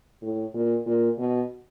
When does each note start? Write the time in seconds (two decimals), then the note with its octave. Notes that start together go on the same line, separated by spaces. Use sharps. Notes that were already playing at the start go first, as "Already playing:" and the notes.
0.22 A2
0.54 A#2
0.86 A#2
1.18 B2